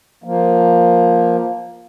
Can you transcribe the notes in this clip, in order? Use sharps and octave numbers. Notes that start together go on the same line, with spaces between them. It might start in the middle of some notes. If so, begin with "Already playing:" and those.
F3 A#3